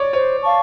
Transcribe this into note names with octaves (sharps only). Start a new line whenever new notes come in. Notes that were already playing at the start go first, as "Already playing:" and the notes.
Already playing: C#5 D5
C5 C#5
F5 A5 C#6